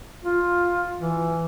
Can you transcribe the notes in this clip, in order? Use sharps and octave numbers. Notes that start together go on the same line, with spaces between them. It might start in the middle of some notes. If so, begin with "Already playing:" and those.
F4
E3